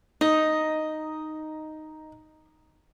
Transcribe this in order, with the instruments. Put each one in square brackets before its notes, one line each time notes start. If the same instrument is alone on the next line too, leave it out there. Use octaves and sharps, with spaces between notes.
[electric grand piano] D#4 [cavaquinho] D#5